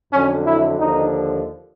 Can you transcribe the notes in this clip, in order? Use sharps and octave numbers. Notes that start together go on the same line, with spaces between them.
F2 D3 F#3 C#4
E4
D#2 D3 F3 D#4